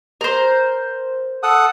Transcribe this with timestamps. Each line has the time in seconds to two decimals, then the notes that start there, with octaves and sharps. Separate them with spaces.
0.21 A#4 C5
1.43 A4 F#5 D#6